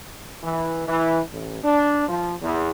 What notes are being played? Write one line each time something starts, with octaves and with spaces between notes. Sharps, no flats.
E3
E3
A1
D4
F3
E2